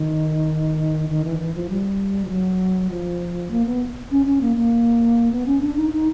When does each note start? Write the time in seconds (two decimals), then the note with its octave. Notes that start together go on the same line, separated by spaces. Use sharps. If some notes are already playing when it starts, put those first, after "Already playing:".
Already playing: D#3
1.09 D#3
1.25 E3
1.40 E3
1.55 F3
1.70 G3
2.25 F3
2.30 F#3
2.90 F3
3.51 A#3
3.66 B3
4.11 C#4
4.26 C#4
4.41 A#3
4.56 A#3
5.32 B3
5.46 C#4
5.61 D4
5.77 D#4
5.92 D#4